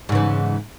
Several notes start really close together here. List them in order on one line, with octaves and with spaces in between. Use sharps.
G#2 C#3 E3